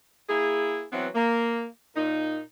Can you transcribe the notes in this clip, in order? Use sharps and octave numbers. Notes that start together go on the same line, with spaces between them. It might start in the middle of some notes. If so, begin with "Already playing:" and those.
A#3 E4 G#4
E3 F#3 B3 C4 E4
A#3
A#2 D#4